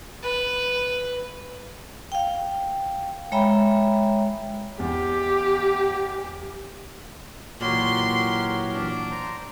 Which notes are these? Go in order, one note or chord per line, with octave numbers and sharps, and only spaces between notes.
B4
F5 G5
G#3 C#5 E5 G5 A#5 B5
E2 G4
A#2 E3 F#3 F#4 G4 A#4 C#5 C6
D4
C5 A#5